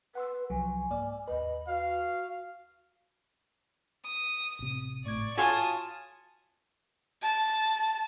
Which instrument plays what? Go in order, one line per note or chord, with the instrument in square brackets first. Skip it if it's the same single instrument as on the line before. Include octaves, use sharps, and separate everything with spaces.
[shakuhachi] B4 [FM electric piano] F#5 C6 E6
[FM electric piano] C2 F3 F#3 [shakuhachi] G#5
[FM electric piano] G#2 A#3 D5
[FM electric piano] D#2 B4 [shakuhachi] D#5
[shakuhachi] F#4 [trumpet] F5
[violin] D#6
[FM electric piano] A1 C3
[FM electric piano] G#1 A2 G#6 [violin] D5 C#6
[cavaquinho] F4 C#5 G#5 [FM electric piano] F#4 [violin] A5 D#6
[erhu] A5